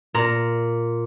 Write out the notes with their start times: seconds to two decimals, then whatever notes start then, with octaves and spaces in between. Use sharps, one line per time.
0.14 A#2 A#5